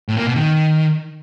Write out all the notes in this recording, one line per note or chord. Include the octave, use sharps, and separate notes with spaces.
A2
A#3
B2
D#3